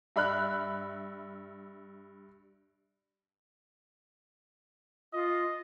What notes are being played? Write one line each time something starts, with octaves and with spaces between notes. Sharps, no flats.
G2 E5 B5 F6 F#6
F4 D#5